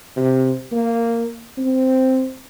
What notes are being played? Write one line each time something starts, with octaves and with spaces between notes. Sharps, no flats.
C3
A#3
C4